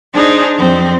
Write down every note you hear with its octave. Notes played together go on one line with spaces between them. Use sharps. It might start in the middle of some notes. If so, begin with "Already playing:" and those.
D4 D#4 G#4 C5
F2 C4